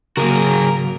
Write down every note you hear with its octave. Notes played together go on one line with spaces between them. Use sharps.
G#1 C#3 F#3 A#3 F#4 G#4 A#4